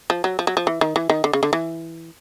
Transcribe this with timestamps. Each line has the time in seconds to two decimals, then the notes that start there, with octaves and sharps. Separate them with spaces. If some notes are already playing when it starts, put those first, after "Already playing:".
0.10 F3
0.24 F#3
0.39 F3
0.47 F#3
0.57 F3
0.67 E3
0.81 D#3
0.96 E3
1.10 D#3
1.24 D3
1.33 C#3
1.43 D3
1.53 E3